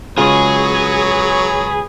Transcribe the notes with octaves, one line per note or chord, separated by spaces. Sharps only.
C#3 F#3 G#3 F4 G#4 B4 C#5